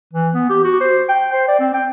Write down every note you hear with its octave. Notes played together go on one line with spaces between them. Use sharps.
E3
B3
G4
F#4
C5
G5
C5
D5
C4
G5